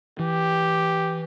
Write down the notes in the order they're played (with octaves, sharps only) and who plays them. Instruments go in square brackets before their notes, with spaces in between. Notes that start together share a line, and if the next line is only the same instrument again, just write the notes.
[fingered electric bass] E3 [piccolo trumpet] G4